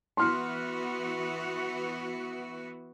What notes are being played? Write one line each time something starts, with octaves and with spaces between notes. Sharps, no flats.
E3 B3 F#4 C6 F6